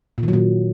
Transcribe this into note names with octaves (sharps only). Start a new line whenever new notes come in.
A#2
D#3
F#3
A#2